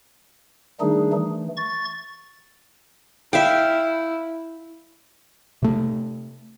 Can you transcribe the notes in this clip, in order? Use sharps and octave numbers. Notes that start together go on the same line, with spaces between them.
D#3 G3 A3 D4 D#4 G#4
E3 A3
C#6 A6
E4 E5 F5 G5
C3 A3